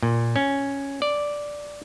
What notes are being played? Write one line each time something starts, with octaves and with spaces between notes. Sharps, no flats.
A#2
C#4
D5